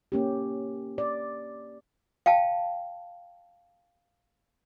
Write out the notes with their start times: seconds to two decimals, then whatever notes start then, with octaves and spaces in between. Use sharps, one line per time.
0.12 A#3 C#4 G4
0.98 D5
2.26 F5 G5 A5